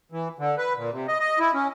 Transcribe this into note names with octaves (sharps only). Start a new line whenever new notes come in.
E3
D3
B4
A#2
C3
D#5
D#5
E4
C#4